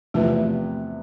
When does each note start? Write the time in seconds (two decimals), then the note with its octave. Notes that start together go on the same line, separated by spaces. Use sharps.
0.14 E2 C3 F3 A3 B3 E4